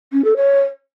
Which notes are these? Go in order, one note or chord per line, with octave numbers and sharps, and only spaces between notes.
C#4
A4
C#5